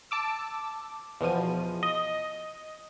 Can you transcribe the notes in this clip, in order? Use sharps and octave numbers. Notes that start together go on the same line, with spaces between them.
A5 D6 E6
E2 B2 F3 D#7
D#5